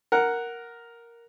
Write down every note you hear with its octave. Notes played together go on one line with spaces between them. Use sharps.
A#4 F#5